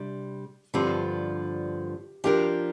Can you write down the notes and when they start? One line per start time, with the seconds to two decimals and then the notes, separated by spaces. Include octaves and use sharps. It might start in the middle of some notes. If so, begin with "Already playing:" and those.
Already playing: C3 G3 D4
0.74 G2 D3 F3 C4 G4
2.24 F3 D4 G4 A#4